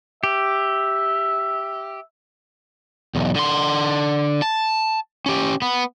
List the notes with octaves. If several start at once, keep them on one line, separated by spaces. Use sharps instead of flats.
G4 E5
B1 E2
D3 C6
A5
C#4 G4
B3